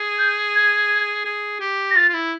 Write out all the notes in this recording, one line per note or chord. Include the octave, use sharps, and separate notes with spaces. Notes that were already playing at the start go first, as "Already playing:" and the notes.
Already playing: G#4
G6
G#6
G#4
G4
A#6
F4 A6
F4
E4